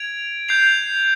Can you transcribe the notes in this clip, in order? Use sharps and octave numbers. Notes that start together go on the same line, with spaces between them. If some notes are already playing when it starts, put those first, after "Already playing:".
Already playing: G#6 D7 F7
G6 C7 F7